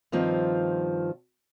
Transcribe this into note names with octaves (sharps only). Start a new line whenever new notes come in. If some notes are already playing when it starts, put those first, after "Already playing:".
G2 D#3 F3 C4 F4